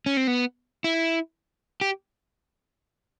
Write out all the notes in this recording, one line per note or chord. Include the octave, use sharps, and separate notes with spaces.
C#4
C4
B3
E4
G4